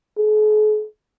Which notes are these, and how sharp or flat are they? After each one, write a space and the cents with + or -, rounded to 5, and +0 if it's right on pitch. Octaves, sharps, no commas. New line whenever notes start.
G#4 +45